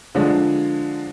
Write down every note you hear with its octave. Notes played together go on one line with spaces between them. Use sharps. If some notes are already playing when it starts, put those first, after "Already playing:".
D3 F3 G#3 D4